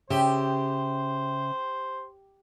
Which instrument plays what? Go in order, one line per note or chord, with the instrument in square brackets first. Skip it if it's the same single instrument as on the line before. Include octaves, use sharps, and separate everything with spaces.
[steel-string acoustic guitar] C#3 E5 G5 [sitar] G4 [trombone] C5